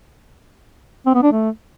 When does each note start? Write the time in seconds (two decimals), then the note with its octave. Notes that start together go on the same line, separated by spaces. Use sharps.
1.06 C4
1.15 B3
1.23 D4
1.32 A3